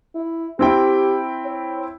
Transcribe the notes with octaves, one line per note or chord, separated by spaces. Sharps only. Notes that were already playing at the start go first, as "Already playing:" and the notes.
E4
C4 E4 G4 G5
C#5